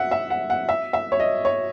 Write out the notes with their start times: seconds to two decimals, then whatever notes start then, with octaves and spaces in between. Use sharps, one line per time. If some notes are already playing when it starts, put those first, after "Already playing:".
Already playing: E5 F#5
0.11 E5
0.30 F#5
0.50 F#5
0.69 E5
0.93 E5
1.12 C#5
1.20 D#5
1.45 C#5